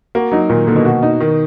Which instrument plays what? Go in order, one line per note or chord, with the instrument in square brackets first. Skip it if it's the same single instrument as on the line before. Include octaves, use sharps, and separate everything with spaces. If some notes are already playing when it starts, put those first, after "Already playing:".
[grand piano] A#3 [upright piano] F#4
[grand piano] F#3 [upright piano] D#4
[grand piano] A#2 [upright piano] D#3
[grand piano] D3 [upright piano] A#3
[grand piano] B2
[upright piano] F#4
D#4
D#3